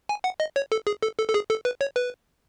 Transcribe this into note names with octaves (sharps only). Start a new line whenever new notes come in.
G#5
F#5
D#5
C#5
A4
G#4
A4
A4
A4
G#4
A4
B4
C#5
B4